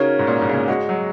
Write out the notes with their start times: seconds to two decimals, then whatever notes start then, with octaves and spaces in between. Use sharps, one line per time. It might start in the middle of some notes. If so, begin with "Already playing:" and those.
Already playing: C#3 D#4 F#4 A#4 C#5
0.19 G#2
0.27 A#2
0.41 G#2
0.49 C#3
0.54 A#2
0.68 G#3 F#4 D#5 F#5
0.89 F#3